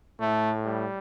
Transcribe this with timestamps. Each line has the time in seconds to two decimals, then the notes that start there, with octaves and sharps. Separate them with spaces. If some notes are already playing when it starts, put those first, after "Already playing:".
0.20 A2 A3
0.67 G3